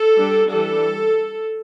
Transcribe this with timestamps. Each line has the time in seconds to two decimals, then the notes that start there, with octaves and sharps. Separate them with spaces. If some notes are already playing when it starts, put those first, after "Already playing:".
Already playing: A4
0.16 G3 D4
0.49 E3 G3 D4 A4